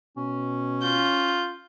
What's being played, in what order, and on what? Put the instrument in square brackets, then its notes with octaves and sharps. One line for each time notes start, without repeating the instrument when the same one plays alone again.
[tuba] B2 [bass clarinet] C#4
[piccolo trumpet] F4 [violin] G6